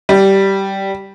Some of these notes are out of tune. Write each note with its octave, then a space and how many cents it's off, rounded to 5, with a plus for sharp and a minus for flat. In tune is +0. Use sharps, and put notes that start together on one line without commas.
G3 -10